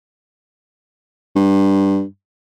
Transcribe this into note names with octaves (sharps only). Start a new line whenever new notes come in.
G2